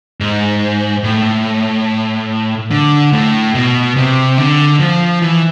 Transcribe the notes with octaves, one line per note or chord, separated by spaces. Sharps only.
G#2
A2
D3
A2
B2
C3
D3
F3
E3